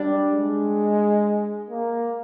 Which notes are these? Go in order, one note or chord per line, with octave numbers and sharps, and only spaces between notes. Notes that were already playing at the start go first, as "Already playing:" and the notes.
Already playing: G3 D4
G#3
A#3